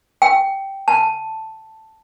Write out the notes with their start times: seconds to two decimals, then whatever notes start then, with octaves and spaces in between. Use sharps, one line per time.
0.22 G5
0.88 A5